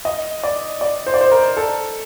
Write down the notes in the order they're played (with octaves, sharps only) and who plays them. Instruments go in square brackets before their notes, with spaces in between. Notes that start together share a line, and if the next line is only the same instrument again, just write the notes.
[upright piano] D#5
D5
D5
C5
D5
C5
A#4
A4